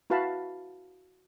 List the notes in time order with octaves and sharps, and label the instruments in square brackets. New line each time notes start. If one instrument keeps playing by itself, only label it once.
[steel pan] E4 F#4 B4 F5 A5 B5